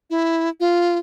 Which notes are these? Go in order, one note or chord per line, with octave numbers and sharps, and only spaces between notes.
E4
F4